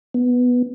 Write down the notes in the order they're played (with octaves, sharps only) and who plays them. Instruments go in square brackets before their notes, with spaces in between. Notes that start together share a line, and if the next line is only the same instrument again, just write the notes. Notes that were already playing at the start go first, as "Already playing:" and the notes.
[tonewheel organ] B3